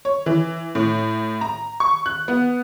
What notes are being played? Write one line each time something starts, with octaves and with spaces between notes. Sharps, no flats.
C#5
E3
A2
A#5
C#6
F#6
B3